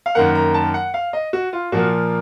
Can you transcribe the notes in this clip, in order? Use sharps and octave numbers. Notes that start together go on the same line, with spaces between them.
F5
F#2 D#3 A#3 F#5
A#5
A5
F#5
F5
D#5
F#4
F4
A#2 F3 A#3 F#4